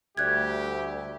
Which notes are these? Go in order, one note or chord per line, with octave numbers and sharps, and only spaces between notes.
D2 G3 A3 G4 D5 E5 F#6 G#6